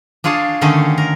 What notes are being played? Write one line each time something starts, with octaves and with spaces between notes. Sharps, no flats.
D4 F4 G#4 C#5 A5
D3 D#3 A3 C#4 G#4 A4
A#4